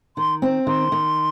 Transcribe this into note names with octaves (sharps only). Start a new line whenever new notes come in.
D#3 C6
C4
D#3 C6
D#3